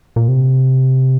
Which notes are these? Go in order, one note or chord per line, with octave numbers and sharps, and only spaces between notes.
A#2
C3